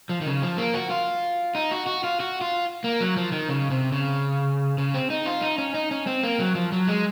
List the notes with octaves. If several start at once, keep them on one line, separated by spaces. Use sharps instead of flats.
F3
D#3
C#3
F3
A#3
F#4
F4
D#4
F#4
F#4
F4
F#4
F4
A#3
F#3
F3
D#3
C#3
C3
C#3
C#3
C4
D#4
F4
D#4
C#4
D#4
C#4
C4
A#3
F#3
F3
F#3
G#3